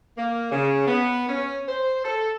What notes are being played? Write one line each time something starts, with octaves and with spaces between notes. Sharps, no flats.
A#3
C#3
B3
C#4
C5
A4